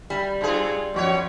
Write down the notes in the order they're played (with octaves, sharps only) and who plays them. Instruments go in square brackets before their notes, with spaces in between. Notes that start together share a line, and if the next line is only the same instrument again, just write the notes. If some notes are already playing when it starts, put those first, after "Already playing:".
[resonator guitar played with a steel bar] G3
[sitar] G2 G#4 [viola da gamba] F4
[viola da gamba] F#2 F3 [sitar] B2 F#4 C#5